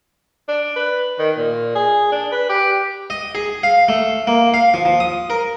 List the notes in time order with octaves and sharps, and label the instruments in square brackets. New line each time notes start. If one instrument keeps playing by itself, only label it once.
[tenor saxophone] D4
B4
D#3
A#2
G#4
D4
B4
G4
[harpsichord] D#5
G#4
F5
A3
A#3
F5
F3
F3
D#6
A#4